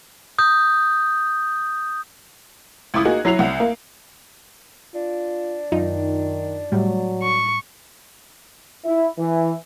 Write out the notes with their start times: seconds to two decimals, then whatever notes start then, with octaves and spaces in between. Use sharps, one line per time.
0.38 D#6 G6
2.94 C#2 E4 D6 D#6
3.05 A#3 D#4 F#4 G#4
3.25 F#3 E4 F#4 C7 F7
3.39 C2 F#5
3.60 A#3
4.94 D4 F4
5.72 F#2 D#3 D#4 F4
6.72 A2 F#3 G3
7.23 C#6
8.85 E4
9.18 E3